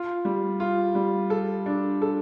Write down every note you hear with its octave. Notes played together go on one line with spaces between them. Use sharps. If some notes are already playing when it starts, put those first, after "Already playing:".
Already playing: F4
G3
F4
G3
A4
D4
A4